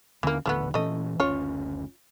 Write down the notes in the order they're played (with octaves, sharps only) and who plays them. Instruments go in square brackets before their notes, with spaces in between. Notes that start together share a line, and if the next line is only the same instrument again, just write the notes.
[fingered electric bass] D#2 D3 C#4 [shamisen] E3 A#3
[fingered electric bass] D#1 A1 D3 [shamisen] F3 A3 B3
[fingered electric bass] A#2 E3 C#4 [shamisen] A3 D#5
[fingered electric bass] F#1 D2 C#4 [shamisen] F4 C#5